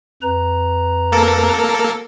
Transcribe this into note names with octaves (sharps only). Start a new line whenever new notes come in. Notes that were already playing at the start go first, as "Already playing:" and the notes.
F2 B4 A#5
A#3 A4 A#4